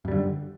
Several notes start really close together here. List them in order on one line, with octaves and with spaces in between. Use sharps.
F#2 G3 D3